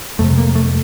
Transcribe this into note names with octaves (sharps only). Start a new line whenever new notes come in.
F2 C3 A3
A#3
A3